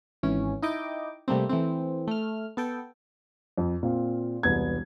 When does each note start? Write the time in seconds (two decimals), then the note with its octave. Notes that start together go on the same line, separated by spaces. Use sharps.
0.23 G#1 E3 C#4
0.62 D#4 E4 D#5 G5 D6
1.28 C3 G3 A3 A#3 C4
1.49 E3 A3 C4
2.08 A3 F6
2.57 B3 A4 G5
3.58 F2
3.83 A#2 C4 F5
4.43 E1 C2 B3 G#6